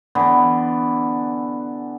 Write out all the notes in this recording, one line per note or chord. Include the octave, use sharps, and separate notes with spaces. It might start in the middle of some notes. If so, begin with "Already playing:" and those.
D3 E3 B3